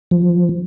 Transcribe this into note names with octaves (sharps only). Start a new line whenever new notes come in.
F3